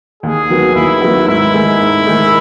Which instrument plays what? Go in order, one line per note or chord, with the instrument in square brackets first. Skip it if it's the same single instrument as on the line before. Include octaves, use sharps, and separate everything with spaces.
[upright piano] D#2 [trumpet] G#4
[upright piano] D#3 F#3 B3 F#4
[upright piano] D#2 [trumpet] E4
[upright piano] D#3 F#3 B3 F#4
[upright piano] G#2 [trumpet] E4
[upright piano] D#3 G#3 D#4 G#4
G#2
D#3 G#3 D#4 G#4